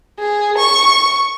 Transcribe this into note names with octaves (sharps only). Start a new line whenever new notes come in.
G#4
C#6